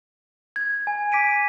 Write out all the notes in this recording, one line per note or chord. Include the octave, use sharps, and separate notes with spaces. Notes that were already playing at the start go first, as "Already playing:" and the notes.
G#6
G#5
D6 B6 D7 D#7